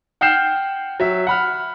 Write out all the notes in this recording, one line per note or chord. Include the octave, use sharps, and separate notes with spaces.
F#5 G5 F6 G6 C7 E7
F#3 E5
F#5 B5 F6